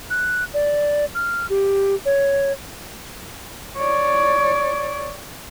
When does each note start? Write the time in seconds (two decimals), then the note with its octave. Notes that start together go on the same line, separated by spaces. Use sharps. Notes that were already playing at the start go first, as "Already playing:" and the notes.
0.10 F#6
0.54 D5
1.15 F6
1.50 G4
2.05 C#5
3.77 C#5 D5